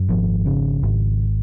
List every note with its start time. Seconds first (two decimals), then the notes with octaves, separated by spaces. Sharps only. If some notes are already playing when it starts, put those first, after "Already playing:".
Already playing: F#2
0.09 G#1 F3
0.46 C#3
0.83 G#1